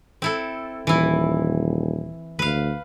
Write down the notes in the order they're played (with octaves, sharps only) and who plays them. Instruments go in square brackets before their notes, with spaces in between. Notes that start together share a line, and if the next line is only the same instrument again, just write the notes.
[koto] C4 E4 A4
[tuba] D#1 [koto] E3 E4
[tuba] D2 [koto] B4 F5